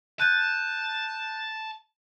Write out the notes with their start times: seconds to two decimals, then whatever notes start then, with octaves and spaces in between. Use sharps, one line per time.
0.20 A5 F#6 G6 D#7